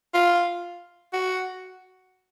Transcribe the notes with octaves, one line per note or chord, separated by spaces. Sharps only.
F4
F#4